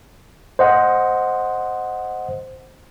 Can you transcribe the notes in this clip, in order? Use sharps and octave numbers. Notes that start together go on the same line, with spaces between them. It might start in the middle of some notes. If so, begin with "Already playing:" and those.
C5 D#5 F#5